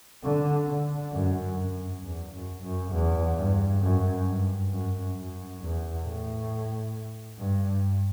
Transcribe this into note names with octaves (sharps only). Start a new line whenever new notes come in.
D3
D3
F#2
F#2
E2
F#2
F#2
E2
G2
F#2
G2
F#2
F#2
E2
A2
G2